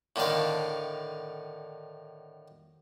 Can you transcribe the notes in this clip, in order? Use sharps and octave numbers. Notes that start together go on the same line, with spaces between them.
A2 D3 D#3 F5